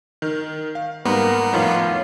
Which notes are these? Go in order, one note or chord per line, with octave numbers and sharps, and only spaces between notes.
D#3 F6
F5
G#2 G3 A#3 B3 A#4
F2 A2 D#3 F4 C#5